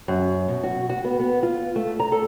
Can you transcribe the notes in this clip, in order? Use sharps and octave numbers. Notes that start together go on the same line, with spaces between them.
F#2
B2
F#4
F#4
B3
B3
F4
A3
A#5
A4